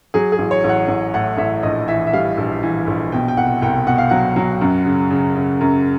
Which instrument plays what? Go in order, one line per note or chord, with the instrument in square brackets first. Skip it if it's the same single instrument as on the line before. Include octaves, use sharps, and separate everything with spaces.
[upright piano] F#3 G#4
G#4
A1
C#5
A1
F#5
A1
A2 F#5
A1 E5
A#1 D#5
E3 E5
E5
G3 F5
A#1
E3
A#1
B2 G5
G5
C2 F#5
C2 G5
B2 F#5
F5
F#3 F#5
F#3
F#2
C#3
C#3
C#3
F#2